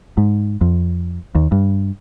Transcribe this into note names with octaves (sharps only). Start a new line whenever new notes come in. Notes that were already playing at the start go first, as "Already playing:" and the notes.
G#2
F2
D#2
G2